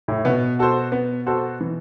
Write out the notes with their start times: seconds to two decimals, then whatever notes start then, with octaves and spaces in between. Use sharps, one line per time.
0.08 A2
0.25 B2 B3
0.59 F#4 A4 C5
0.92 B3
1.27 F#4 A4 C5
1.61 E3